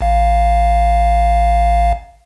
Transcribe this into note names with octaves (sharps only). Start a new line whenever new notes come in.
A1 F5